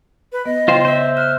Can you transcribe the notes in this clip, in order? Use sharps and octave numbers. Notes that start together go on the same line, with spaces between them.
B4
B3 D#5
C#3 F4 C5 G5 C6
C5 E5
F6 F#6